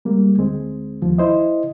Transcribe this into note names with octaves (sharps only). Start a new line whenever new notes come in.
G3 G#3 A#3
D2 G#3 C4
D#2 F3
E4 C5 D#5